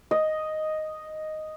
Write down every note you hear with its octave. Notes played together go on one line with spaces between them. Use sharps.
D#5